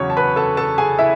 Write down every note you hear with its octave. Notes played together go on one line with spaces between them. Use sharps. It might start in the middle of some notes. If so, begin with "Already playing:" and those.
Already playing: E2 C#3 F#3 C#5 C#6
A5
B4 B5
A4 A5
A4 A5
G#4 G#5
E4 E5